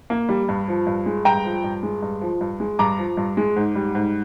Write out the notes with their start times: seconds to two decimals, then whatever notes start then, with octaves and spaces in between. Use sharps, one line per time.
0.10 A#3
0.29 G3
0.49 G2
0.68 F3
0.87 G2
1.06 G#3
1.25 G2 G5 A#5
1.45 F3
1.64 G2
1.83 G#3
2.02 G2
2.21 F3
2.41 G2
2.60 G#3
2.79 G2 A#5 D6
2.98 F3
3.17 G2
3.37 G#3
3.56 G#2
3.76 G3
3.95 G#2